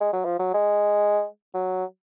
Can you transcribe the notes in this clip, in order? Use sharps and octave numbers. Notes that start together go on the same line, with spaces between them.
G#3
F#3
F3
F#3
G#3
F#3